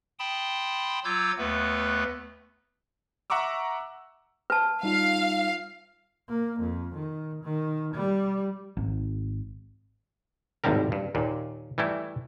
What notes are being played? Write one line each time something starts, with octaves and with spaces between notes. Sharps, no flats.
G5 A5 B5 C6 D#6
F#3 F4 D6 E6 G6 G#6
D#2 A3 B3 B4
E5 F#5 A#5 C#6 D6 E6
B4 A5
G3 D#4 F4 F5
A#3
F2
D#3
D#3
G3
G#1
G#1 D#2 A2 C3 G3 A#4
G2
D#2 A#2
E3 G3 A3 E4